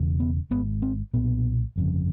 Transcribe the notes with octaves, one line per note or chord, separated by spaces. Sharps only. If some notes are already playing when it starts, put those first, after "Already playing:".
Already playing: E1 E2 C#3
B3
G#1 G#2 B3
C4
B1 A#2 B3
G1 F2 C#3